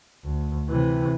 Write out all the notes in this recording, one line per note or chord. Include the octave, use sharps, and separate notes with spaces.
D2
C3 E3